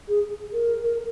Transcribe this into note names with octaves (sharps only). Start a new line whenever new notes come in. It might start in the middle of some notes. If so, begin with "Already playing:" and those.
G#4
A#4
A#4